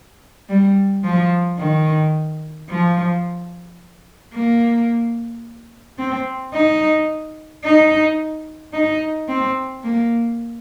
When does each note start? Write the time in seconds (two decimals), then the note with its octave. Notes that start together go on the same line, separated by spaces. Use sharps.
0.49 G3
1.04 F3
1.58 D#3
2.69 F3
4.33 A#3
5.99 C4
6.53 D#4
7.64 D#4
8.73 D#4
9.28 C4
9.83 A#3